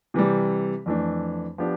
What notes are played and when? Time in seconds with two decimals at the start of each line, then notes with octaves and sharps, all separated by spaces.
0.14 C3 E3 G3
0.86 F2 E3 A3 D4
1.58 F3 B3 D4 G4